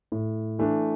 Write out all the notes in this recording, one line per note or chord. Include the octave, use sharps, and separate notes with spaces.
A2
E3 A3 D4